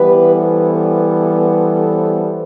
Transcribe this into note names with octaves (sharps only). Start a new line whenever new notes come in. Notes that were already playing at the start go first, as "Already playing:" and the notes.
Already playing: E3 G3 B3 G4 B4
A4 C5